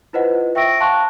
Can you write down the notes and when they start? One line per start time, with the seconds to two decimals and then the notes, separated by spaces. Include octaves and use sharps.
0.13 E4 F4 B4 C5 D#5 F#5
0.55 E5 G5 C#6 E6 A#6 D7
0.80 F5 G5 A5 C6 C#6 F#6